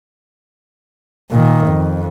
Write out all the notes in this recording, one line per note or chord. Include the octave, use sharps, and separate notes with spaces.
A#2 D#3
F2